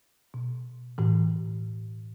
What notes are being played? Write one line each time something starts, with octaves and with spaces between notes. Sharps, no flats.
B2
A2 E3